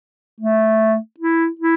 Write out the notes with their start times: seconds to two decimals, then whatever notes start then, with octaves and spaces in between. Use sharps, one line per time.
0.41 A3
1.20 E4
1.59 E4